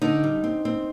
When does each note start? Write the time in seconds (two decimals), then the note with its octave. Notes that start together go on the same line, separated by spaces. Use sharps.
0.02 D3 D#4
0.23 G3
0.44 C4
0.65 C4